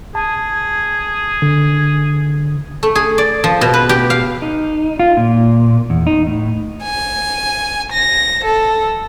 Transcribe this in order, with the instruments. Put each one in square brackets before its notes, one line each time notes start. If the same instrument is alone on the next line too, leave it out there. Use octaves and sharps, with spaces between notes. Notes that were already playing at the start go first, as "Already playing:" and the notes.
[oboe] G#4 [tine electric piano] A5
[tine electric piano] D3
[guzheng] A3
G#4
D5
F3
B2
B4
G4
F5
[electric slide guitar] D#4
F4
A#2
E2
D#4
A2
[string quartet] G#5
A#6
A4